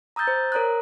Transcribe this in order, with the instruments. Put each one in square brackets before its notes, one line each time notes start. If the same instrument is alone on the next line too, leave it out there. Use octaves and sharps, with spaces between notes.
[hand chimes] A#5 D#6 E6 G6 A6
C5
A#4 C#5 A#5 D#6 F#6